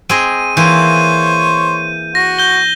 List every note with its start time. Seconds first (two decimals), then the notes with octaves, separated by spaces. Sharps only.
0.09 C4 G#4 D#5 D#7
0.57 E3 A#3 C5 C#5 G6 D#7
2.15 F#4 A#6
2.39 G6 G7